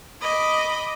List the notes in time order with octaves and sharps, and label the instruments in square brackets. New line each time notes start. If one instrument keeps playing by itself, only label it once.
[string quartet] D#5 B5 D6